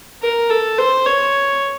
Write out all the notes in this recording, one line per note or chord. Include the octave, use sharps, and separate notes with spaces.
A#4
A4
C5
C#5